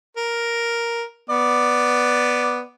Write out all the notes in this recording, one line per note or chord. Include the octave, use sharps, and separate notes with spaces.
A#4
B3 D5